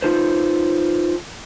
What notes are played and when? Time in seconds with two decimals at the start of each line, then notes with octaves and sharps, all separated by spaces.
0.02 D#4 F4 A4 B4 C5